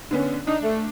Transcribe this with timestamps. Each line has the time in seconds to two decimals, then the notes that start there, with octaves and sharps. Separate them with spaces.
0.11 D3 B3 C#4
0.47 D4 D#4
0.63 A3